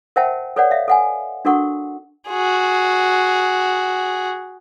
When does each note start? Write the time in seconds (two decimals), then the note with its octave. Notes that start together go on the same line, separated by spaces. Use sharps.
0.16 A#4 C5 E5 F#5 G5 A5
0.56 A4 B4 C#5 D5 F#5
0.71 E5 F5
0.88 A4 F#5 G#5
1.45 D4 F#4 A4 A#4 F#5 C#6
2.29 F#4 G#4